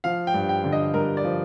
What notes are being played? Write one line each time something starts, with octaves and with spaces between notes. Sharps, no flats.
F3 F5
G5
G2
G5
D3
D#5
G2 A#4
D5
F3